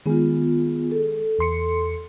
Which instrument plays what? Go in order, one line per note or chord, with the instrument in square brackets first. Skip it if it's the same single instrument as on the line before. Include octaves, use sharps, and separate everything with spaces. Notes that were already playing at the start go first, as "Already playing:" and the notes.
[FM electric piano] D#3 G#3 G#4 [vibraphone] B3 F4
[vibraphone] A4
[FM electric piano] E2 C6 C#7